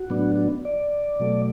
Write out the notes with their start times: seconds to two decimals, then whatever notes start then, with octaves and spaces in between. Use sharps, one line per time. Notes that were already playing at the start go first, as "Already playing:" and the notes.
Already playing: F#4
0.10 A2 F#3 B3 D4
0.65 D5
1.20 B2 F#3 A3